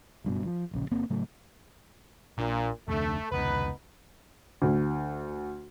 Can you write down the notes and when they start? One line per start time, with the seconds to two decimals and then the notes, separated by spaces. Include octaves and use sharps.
0.24 F#1 G2 B2
0.46 F3
0.71 D1 A#1 C#3
0.91 G1 A#3 C4
1.10 A2 C#3 F#3 A3
2.38 A#1 A#2 D4
2.88 F1 D2 D3 A3
3.32 F1 C#2 B3 D#4 B4
4.62 D2